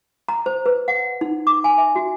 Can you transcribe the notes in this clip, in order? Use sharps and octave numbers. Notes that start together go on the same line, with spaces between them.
A#5
C5
B4
F#5
D#4
D6
G#5
E5
F#4